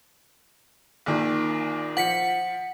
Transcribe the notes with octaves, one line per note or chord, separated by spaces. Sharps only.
A#1 A#2 D#3
F3 F#5 B6 C#7